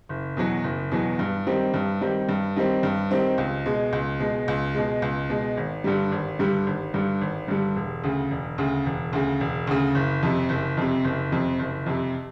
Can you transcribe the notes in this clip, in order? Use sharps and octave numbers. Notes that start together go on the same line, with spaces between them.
F#1
E2 B2 F#3
F#1
E2 B2 F#3
G2
D#3 G3 C4
G2
D#3 G3 C4
G2
D#3 G3 C4
G2
D#3 G3 C4
C#2
B2 G#3
C#2
B2 G#3
C#2
B2 G#3
C#2
B2 G#3
G#1
G2 D3 G3
G#1
G2 D3 G3
G#1
G2 D3 G3
G#1
G2 D3 G3
E1
D2 C#3
E1
D2 C#3
E1
D2 C#3
E1
D2 C#3
F#1
F2 C3
F#1
F2 C3
F#1
F2 C3
F#1
F2 C3